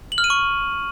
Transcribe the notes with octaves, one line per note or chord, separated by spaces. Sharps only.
F#7
F6
D#7
C#6